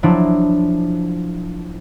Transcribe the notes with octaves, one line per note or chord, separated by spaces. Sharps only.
F3 F#3 D4 E4